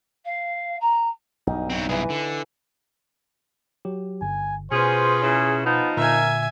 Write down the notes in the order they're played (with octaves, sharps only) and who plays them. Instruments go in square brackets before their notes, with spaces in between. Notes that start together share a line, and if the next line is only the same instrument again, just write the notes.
[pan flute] F5
A#5
[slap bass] B1 G2 [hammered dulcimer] D#4
[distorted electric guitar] F#3 C4
[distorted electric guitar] C2 G#4 [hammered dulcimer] E3 B4
[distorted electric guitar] D3
[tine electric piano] F#3 G4
[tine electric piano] G1 [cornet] G#5
[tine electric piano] B2 [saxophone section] C#4 G#4 [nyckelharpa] F4 B4 [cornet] C5
[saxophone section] C#3 C#4 E4 [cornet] G#4
[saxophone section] F3 D#4 [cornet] B3
[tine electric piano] A#2 D3 [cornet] A#4 [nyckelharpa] E5 G#5